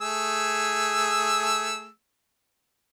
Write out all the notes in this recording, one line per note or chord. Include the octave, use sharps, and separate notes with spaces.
A3 G#4 E6